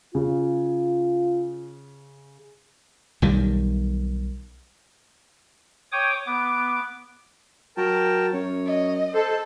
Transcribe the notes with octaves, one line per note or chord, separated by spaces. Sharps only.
C#3 F4
B1 D#3 G3
C#5 G5 D6 D#6
B3 D6
F#3 A#4 G5 A5
F#2 C#5
D#5
A4 C5